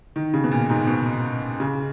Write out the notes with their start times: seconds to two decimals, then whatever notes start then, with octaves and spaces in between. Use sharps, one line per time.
0.16 D#3
0.34 C#3
0.44 B2
0.51 A#2
0.69 G#2
0.87 B2
1.60 C#3